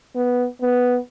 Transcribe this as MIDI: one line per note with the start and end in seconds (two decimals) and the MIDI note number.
0.16 0.46 59
0.62 0.98 59